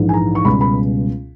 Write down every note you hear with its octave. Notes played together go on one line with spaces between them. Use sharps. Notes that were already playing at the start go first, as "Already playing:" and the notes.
Already playing: A#1 G#2 E3 G#3
G#5
A#5
C#6
C#2 B2 G3 B5
B5